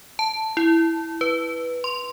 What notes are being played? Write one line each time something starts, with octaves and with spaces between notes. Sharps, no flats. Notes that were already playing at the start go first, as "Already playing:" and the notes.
A5
E4
B4
C6